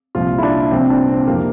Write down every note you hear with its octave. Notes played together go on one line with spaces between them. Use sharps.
C2 A#2 F3 F4
E4
D4
C2 A#2 F3 C4
D4
C4
F2 C3 E3 A#3